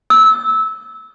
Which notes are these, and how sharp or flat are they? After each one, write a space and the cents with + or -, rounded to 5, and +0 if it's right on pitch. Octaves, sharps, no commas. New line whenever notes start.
E6 -20